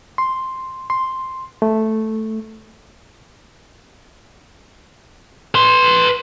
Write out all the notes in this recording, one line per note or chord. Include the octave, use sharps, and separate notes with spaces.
C6
C6
A3
B4 C6